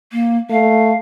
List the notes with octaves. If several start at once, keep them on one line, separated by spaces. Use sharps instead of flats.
A#3
A3 F5